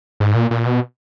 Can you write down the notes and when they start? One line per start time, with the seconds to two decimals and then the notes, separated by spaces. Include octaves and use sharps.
0.20 G#2
0.35 A#2
0.51 A#2
0.66 B2